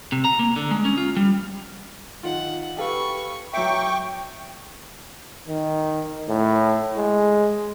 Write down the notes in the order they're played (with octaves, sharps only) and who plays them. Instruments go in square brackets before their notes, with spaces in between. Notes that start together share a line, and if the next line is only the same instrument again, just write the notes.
[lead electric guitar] C3
A#5
A#3
D3
G#3
C#4
F4
G3
[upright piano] D#3 F4 [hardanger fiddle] F#5
[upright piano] G4 A4 F5 [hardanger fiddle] B4 C#6
[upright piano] F#3 E5 [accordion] G5 C#6 [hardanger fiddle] D6
[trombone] D#3
A2
G#3